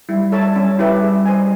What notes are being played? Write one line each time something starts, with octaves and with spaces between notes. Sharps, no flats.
G3 E4
A4 C#5 E5 A5
G3 C#4
E4 G4 B4 E5
G#4
C5 D#5 G#5